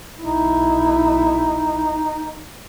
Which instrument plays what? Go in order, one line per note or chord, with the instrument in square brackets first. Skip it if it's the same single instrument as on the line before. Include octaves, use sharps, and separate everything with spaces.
[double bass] B1 E4 [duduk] D#4